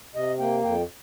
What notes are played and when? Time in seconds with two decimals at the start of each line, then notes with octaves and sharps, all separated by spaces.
0.14 C3 D#5
0.39 A#3 G5
0.63 F2 G5